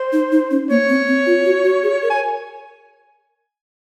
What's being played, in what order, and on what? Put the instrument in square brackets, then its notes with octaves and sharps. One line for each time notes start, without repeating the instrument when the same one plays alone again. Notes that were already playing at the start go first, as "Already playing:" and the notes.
Already playing: [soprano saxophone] C5
[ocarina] D#4
D#4
C#4
[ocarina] A#3 [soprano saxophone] C#5
[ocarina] C4
C4
F4
F#4
F#4
G#4
A#4
[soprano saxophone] G#5